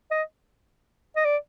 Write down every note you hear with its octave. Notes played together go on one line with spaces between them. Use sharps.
D#5
D#5
D5